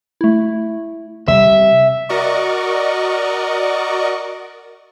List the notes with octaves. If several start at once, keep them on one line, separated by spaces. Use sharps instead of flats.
A3 E4
C3 G3 E5
F#4 A#4 D5 D#5 C#6